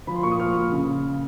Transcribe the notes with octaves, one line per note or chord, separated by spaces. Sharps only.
F3 B5
C6
A#2 C#6
D#6
F3 F6
A#2
C#3